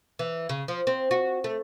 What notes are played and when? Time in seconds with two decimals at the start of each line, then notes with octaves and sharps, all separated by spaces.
0.19 E3
0.49 C#3
0.68 F3
0.87 C4
1.11 F#4
1.44 A3